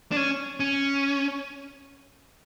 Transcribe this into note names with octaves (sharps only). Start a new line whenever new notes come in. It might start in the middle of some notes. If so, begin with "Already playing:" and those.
D4
C#4
C#4